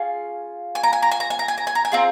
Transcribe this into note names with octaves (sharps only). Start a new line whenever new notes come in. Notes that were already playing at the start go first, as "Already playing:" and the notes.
Already playing: C#4 F4 G#4
G#5
A#5
G#5
A#5
G#5
A#5
G#5
A#5
G#5
A#5
G#5
A#5
G#5
C4 F4 G#4 A#5